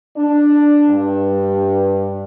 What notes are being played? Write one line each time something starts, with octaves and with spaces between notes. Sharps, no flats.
D4
G2